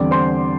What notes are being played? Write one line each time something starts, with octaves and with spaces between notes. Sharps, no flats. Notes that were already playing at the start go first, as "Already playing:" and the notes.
Already playing: E2 D3 G3 C4 D5 D6
C5 C6